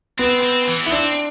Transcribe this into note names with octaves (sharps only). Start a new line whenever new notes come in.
B3 C4
C4
E3
B3 E4
C4 D4